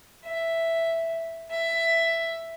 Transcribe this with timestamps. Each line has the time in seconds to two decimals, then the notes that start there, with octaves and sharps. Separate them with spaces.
0.25 E5
1.50 E5